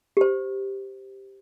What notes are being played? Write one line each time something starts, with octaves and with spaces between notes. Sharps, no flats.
G4 C5